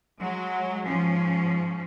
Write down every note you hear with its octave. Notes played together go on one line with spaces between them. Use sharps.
F#3 G#3
G#2 F3 C#4